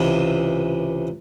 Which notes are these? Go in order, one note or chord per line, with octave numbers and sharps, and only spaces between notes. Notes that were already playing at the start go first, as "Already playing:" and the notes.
Already playing: C#2 C3 E3